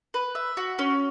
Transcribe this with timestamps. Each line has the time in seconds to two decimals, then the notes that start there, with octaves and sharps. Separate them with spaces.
0.14 B4
0.35 E5
0.57 F#4
0.79 C#4